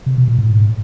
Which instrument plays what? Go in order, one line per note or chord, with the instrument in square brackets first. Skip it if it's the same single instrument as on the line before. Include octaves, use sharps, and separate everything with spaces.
[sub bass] C3
B2
A#2
A2
G#2